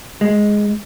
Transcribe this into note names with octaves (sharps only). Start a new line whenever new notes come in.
G#3